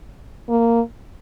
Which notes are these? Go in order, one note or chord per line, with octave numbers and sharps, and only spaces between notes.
A#3